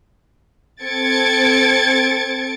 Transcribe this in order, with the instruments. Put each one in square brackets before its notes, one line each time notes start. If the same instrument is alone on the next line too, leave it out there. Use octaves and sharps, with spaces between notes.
[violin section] C4 A4 G#6 A6 C#7 D7